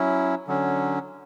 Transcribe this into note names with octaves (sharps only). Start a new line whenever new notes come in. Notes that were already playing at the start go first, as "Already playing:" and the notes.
Already playing: F#3 C#4 E4
D3 F#3 C#4